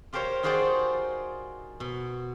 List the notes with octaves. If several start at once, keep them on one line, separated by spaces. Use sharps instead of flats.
F4 G4 A#4 C5 C#5 F5
D#4 F4 F#4 G#4 C5 D5
B2